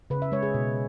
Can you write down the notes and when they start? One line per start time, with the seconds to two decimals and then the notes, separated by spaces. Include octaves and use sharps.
0.10 C#3 B4
0.22 E5
0.32 G#3 C#5
0.43 G#4
0.54 B2